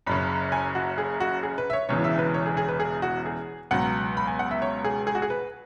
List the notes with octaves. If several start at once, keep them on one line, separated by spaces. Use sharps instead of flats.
F#1 F#2 C#3 B5
G#5
F#4
G#4
F#4
G#4
B4
E5
C#5
E1 E2 C#3 E3 C#5
E5
B4
C#5
G#4
G#4
B4
G#4
F#4
G#4
C#2 B2 F#3 F#5
B5
G#5
F#5
E5
C#5
G#4
G#4
F#4
G#4
B4